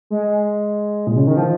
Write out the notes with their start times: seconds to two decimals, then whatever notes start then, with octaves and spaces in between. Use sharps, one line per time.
0.10 G#3
1.07 A#2
1.16 C#3
1.27 D#3
1.37 F3